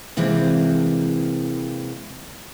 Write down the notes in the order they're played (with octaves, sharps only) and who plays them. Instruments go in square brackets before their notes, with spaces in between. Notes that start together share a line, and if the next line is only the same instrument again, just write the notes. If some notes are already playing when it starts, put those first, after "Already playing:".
[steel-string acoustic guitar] C3 E3 G#3 A#3 C4